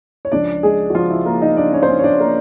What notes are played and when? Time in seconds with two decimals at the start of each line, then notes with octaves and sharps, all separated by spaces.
0.25 C#5
0.32 C#2 C#3 F3 D4 D5
0.63 G#3 G#4
0.90 F#4
0.95 F3 F4
1.11 E4
1.26 A#3 A#4
1.41 D#4 D#5
1.57 D4 D5
1.73 C#4 C#5
1.83 C5
1.89 C#4 C#5
1.99 C#5
2.04 D4 D5
2.19 A#3 A#4